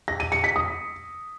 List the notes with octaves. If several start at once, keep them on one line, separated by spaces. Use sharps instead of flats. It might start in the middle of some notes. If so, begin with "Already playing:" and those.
A#6
D#7
C#7
B6
D#6